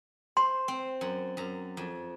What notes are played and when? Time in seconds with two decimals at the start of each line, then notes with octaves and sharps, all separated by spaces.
0.37 C5 C6
0.68 C4
1.01 F#2
1.37 F#2 A#5
1.77 F2